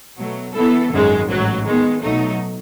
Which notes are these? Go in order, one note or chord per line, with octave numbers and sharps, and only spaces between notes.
B2 F#3 A3
E3 B3 E4 A4
G#1 F#2 D#3 G#3
A1 G#2 F#3
D#3 G#3 B3
B1 B2 F#3 A3 D#4